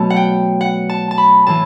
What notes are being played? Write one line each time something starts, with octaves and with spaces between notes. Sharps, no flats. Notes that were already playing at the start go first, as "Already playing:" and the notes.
Already playing: B2 F#3 A3 A5
F#5
G5
F#5
A5
A5
B5
A2 E3 A5